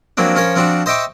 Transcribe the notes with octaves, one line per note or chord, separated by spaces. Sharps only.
F3 F#3 A#3 C4 D4
F3 C#4 A#4 C#5
F3 C4 D4 F#4
C5 D#5 E5 G5 C#6 D6